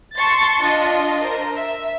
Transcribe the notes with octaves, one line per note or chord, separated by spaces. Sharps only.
A5 C6 C#6 A6
D4 F4 D#5
A#4 C5
E5